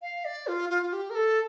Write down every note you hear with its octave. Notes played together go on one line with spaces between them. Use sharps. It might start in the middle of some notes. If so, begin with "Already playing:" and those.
F5
D5
F4
F4
F4
G4
A#4
A4